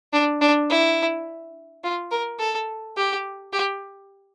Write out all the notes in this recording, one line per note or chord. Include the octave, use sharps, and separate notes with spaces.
D4
D4
E4
F4
A#4
A4
G4
G4